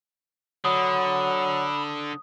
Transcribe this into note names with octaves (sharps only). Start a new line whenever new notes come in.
D3 F#3 B5 D#6